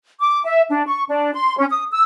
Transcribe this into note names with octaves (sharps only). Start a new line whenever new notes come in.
D6
E5
D4
C#6
D4
C6
C#4
D#6
E6